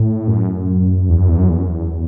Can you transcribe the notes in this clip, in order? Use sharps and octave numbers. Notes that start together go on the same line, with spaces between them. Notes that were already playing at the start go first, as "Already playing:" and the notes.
Already playing: A2
F#2
E2
F#2
E2
F#2
E2
F#2
E2